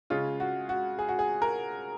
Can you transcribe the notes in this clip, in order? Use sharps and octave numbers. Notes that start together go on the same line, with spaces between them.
C#3 G#3 C#4 F4
F#4
F#4
G#4
F#4
G#4
A#4